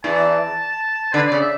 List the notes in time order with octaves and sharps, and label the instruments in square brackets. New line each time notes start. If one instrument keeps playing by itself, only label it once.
[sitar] E2 E3 [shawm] A5
[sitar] D3 [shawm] B4
[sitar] C#3 [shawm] D5
[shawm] E5